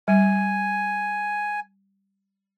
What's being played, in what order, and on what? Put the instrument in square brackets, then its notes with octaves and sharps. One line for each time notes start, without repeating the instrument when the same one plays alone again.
[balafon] G3 [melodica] G#5